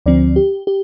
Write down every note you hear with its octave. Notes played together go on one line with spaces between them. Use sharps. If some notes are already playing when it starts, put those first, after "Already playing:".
D2 D3 F3 C4 D5
G4
G4